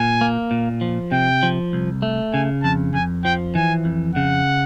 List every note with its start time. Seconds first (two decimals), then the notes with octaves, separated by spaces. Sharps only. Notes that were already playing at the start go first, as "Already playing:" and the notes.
Already playing: A#2 G#5
0.21 A#3
0.51 A#2
0.81 F3
1.12 C3 G5
1.43 F3
1.73 C2
2.02 A3
2.33 C#3 G#5
2.63 F2 A5
2.94 F2 G#5
3.24 F3 G5
3.55 E3 G#5
3.85 F2
4.15 C#3 F#5